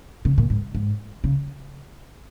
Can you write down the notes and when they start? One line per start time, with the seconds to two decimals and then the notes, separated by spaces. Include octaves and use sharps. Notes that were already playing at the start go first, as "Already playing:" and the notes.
0.25 C#3
0.38 A#2
0.50 G#2
0.75 G#2
1.24 C#3